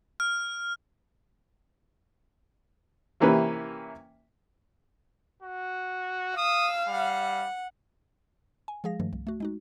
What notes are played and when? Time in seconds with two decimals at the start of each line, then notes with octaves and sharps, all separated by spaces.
0.20 F6
3.20 C3 E3 A#3 C#4 G4 B4
5.42 F#4
6.37 F5 D#6 E6
6.88 G3 F#5
8.68 G#5
8.84 F3 G#3 G#4 F5 A#6
9.00 G2 D#3 F3 A3
9.13 C2
9.27 A3 F#4
9.40 G#3 D#4 F#4